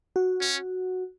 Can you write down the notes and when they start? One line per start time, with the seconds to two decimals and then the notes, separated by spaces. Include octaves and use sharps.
0.16 F#4
0.41 C#4